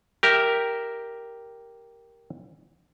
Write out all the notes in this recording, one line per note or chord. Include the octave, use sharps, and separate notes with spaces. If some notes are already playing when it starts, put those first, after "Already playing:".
G4 A#4 E5